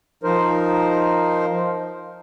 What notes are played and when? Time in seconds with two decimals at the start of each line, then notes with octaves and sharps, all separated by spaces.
0.23 F3 D#4 A#4 C5